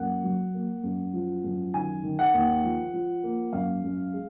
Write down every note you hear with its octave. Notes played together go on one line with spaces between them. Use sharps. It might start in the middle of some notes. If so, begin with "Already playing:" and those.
Already playing: F#2 A#3 F#5
F#3
A#3
F#2
F3
F#2
D#3 G#5
D#3
F#5
D#2
F3
F3
A#3
F#2 F5
F#2
G#3